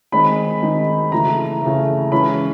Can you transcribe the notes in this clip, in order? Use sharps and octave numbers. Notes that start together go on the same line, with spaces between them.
D#3 G#3 C4 D#4 B5
D#3 G#3 C4 D#4
C#3 E3 A3 A#5
C#3 E3 A3
E3 G#3 C#4 B5